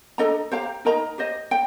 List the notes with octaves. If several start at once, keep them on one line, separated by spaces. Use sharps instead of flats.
D4 A4 D#5 A#5
G4 C5 F5 A#5
D#4 A#4 D#5 A#5
G4 C5 D#5
G5